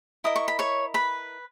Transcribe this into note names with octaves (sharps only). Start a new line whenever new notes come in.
E4 A#4 D#5 D#6
C#6
B5
C#5 C#6
B4 B5